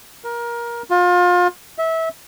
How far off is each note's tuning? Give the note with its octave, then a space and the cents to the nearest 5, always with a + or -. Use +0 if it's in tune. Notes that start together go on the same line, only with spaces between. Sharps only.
A#4 +20
F4 +30
E5 -25